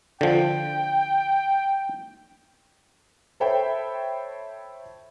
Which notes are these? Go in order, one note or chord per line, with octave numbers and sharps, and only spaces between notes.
D3 F3 G5
A4 C5 C#5 E5 G5 B5